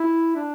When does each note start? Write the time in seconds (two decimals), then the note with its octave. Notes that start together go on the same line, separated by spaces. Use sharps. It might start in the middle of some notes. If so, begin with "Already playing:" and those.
Already playing: E4
0.35 D4